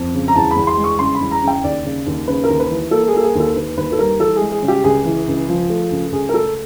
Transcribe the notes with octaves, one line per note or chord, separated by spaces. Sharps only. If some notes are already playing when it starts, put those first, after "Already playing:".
Already playing: F2
C#3
A#5
E2 A5
B5
E2
C6
G#3
C#6
C#3 C6
B5
E2
A#5
C#3
G5
D#2 D5
C#3
D#2
C#3 B4
A#4
D#2
B4
E3
A#3 A4
G#4
A#3 A4
G#4
D#2 A4
D#2 B4
D#2 B4
A4
G3 A#4
E3 A4
G#4
G#3
G#4
C#3
G4
C#2 G#4
E3
C#2
F3
A3
C#2
C#2 G#4
A#4
A3 A4